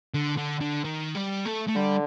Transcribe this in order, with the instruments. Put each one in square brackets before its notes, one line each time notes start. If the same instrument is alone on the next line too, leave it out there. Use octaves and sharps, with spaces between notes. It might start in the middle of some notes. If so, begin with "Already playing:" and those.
[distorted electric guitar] D3
D3
D3
D#3
G3
A3
A3
[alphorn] D3 [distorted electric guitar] G3